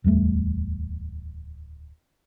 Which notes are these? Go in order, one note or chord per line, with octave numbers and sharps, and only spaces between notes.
D1 E2 G3 A3